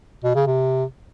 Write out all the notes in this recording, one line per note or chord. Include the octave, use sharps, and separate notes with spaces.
B2
C#3
C3